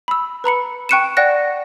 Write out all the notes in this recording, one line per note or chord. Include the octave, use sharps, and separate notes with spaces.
B5 E6
B4 A#5 B5 C#7
G5 C#6 F#6 C#7 D#7 E7
D5 F#5 G5 F#6 A#6